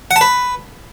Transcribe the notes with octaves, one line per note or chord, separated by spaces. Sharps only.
F#5
A5
B4